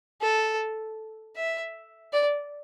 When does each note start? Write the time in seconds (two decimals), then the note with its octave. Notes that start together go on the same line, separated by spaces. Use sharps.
0.21 A4
1.36 E5
2.13 D5